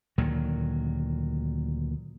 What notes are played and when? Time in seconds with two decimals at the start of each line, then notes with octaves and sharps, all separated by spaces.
0.18 D2 A#2 D#3 F#3